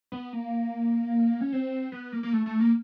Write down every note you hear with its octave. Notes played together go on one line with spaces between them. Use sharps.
B3
A#3
C#4
C4
B3
A#3
A#3
A3
A3
A#3